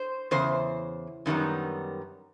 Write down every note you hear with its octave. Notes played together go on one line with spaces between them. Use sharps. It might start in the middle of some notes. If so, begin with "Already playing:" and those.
Already playing: C5
E2 C#3 C5
F#2 D#3 G3 B3